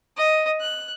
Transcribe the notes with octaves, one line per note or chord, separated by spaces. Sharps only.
D#5
F#6